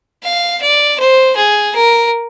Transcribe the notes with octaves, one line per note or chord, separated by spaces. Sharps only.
F5
D5
C5
G#4
A#4